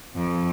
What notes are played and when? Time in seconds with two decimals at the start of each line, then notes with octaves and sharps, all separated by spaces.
0.15 F2